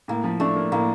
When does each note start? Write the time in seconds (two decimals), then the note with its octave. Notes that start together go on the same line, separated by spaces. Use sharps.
0.08 A2 A#3
0.24 F3
0.40 A3 D4
0.56 A#3
0.72 A2 A#3